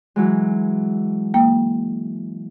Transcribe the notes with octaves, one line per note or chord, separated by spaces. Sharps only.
E3 F#3 G#3
A#3 G5